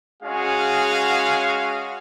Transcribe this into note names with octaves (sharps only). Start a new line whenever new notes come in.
G#3 C#4 F#4 G#4 F5